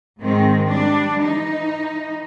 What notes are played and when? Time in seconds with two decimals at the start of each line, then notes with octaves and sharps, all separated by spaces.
0.19 G#2 D#3 G#3 C4
0.70 G3 D4
1.23 E3 D#4